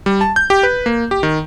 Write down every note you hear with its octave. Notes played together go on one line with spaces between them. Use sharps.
G3
A5
G6
G4
B4
A#3
G4
D#3